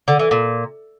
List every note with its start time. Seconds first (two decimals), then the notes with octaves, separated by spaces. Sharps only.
0.08 D3
0.19 E3
0.31 A#2